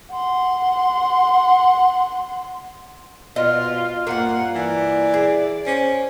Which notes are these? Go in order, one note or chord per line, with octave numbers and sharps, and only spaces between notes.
F#5 C6
B2 F4 D#5
G2 A#3 F4 F#5
E3 D5
G#4
C#4 C5